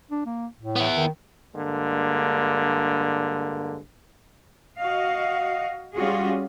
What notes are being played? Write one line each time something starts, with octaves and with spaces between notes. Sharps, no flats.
D4
A#3
A2
B3 E4
D#3
G2 D3 G#3 A#3
F#4 D#5 F5
G3 C#4 F4 F#4 G#4